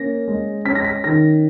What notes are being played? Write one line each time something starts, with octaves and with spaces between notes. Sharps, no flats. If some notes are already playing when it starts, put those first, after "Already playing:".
Already playing: A#3 C#4 A#6
G#3
C#4 B6
A#6
B6
D#3 A#6